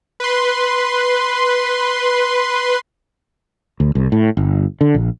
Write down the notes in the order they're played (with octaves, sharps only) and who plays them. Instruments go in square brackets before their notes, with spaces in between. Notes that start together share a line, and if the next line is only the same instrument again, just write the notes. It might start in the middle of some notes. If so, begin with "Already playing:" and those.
[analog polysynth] B4 C6
[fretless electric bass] D2
C2
A2
G1
D3
A#1